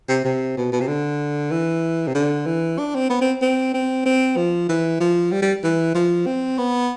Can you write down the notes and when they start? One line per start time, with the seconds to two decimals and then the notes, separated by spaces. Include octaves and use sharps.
0.09 C3
0.24 C3
0.57 B2
0.72 B2
0.81 C3
0.88 D3
1.51 E3
2.07 C3
2.14 D3
2.46 E3
2.78 D4
2.95 C4
3.09 B3
3.21 C4
3.42 C4
3.74 C4
4.05 C4
4.37 F3
4.69 E3
5.00 F3
5.32 G3
5.42 G3
5.64 E3
5.95 F3
6.26 C4
6.58 B3